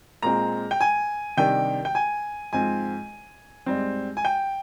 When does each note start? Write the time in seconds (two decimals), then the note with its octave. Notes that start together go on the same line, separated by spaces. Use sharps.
0.22 A#2 G#3 C4 A#5
0.71 G5
0.81 G#5
1.37 C3 D#3 G3 D4 G5
1.85 G5
1.95 G#5
2.53 G#2 F3 C4 G#5
3.66 G#2 G3 C4
4.17 G#5
4.25 G5